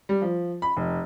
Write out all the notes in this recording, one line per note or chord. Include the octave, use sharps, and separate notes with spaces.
G3
F3
B5
F1